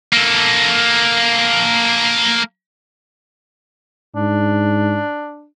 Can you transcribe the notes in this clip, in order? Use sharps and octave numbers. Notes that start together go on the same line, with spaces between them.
A#3 A4
G#2 D4